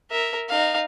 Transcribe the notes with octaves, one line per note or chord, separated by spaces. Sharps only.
A#4 E5
D#4 F5